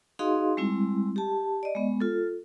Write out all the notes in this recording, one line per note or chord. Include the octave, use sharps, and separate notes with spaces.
D#4 F#4 G#4 D#5 F5 C6
G3 G#3 C4 E4
G4 A5
D5 D#5
G#3 B3
F4 A4